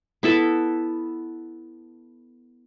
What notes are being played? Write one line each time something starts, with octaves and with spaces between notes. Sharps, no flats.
B3 E4 A4